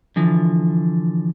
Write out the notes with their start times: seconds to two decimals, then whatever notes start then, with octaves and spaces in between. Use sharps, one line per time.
0.16 D3 E3 F3